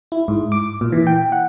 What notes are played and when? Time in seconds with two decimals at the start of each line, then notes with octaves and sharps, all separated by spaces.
0.12 E4
0.28 G#2
0.52 D6
0.81 A#2
0.92 E3
1.07 G5
1.32 F#5